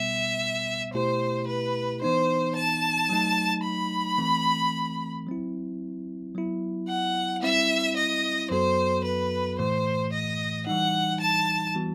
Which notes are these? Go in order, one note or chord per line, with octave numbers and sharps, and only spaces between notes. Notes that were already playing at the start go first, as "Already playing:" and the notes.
Already playing: B2 G3 B3 E5
B2 A3 E4 G4 C5
B4
E3 B3 D#4 C5
A5
F#3 A3 D#4
B5
E3 A3 C4
F#3 C4 E4
F#3 B3 E4
F#5
G3 C4 E4 E5
D#5
F#2 F#3 B3 F#4 A4 C5
B4
A2 E3 A3 C5
D#5
E3 G3 D#4 F#5
A5
E3 G3 B3 F#4